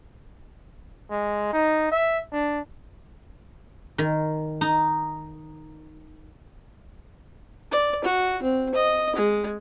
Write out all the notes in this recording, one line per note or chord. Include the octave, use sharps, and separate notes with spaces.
G#3
D#4
E5
D4
D#3
D#4
D5
F#4
C4
D#5
G#3